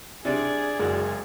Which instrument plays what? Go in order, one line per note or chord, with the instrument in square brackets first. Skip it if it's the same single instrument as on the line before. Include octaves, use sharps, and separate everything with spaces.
[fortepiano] C3 D4 [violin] G#4 [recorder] D5
[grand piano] F#1 [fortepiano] G#3 F#4